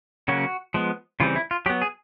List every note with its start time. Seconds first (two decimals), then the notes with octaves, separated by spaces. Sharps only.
0.28 C#3 F#3 A#3 C#4 F#4
0.74 F3 G#3 B3
1.20 C#3 E3 G3 C4 F4
1.36 E4
1.51 F4
1.66 F#3 G4
1.70 B3
1.82 G#4